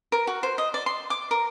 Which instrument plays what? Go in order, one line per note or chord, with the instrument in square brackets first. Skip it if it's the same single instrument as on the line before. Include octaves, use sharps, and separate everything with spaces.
[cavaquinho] A#4
F#4
C5
D#5
D5
C6
D6
A#4